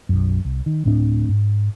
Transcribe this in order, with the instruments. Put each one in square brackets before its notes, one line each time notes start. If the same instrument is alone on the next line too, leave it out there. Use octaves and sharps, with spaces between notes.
[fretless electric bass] B1 F#2
C2
D#3
D1 A2 C4 D4
G#2